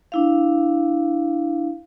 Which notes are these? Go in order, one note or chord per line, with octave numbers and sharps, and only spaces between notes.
D4 E4 F5